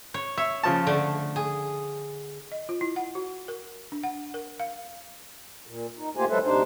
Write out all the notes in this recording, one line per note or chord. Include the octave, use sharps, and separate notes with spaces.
C#5
C#5 E5
C#3 F3 A5
D3 A3
G#4
D#5
F4
E4
F#5
F#4
A#4
D4
F#5
A#4
F5
A#2
D#4
A3 A#3 F4 G4 C5 G#5
F#3 G#3 A4 B4 C5 E5
D2 C3 D4 D#4 C5